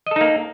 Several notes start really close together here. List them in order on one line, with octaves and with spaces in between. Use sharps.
D#5 A4 D#4 A#3